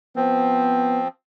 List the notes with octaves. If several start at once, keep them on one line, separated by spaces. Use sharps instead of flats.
F3 B3 C4